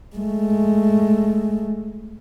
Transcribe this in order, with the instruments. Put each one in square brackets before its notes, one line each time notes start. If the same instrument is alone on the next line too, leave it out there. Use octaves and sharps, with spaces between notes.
[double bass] G#3 A3